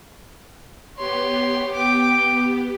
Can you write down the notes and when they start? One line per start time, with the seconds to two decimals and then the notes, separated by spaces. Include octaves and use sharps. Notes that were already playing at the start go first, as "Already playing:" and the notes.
0.97 B3 G4 C#5 C6
1.74 G5 D6